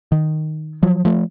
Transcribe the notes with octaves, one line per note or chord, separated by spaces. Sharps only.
D#3
F3 F#3
F3 A3